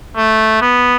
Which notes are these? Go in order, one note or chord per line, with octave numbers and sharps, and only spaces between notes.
A3
B3